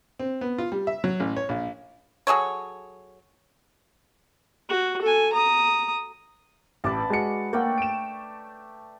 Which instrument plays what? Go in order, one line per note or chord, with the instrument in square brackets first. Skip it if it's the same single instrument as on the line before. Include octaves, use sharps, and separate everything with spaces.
[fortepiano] C4
B3
F4
G3
E5
F#3
A1
C#5
A#1
[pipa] F#3 G#4 A4 C#5
[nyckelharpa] F#4
A4 G#5
A#5 D#6
[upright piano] A1 D6 [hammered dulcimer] B4 D5 A5
[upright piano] G#3 F#4 C#7
[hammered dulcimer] A3 D5 G5 [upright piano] A#3 F#5
[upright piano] D7 E7